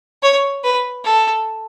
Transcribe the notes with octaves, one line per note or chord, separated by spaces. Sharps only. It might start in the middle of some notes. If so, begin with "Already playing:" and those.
C#5
B4
A4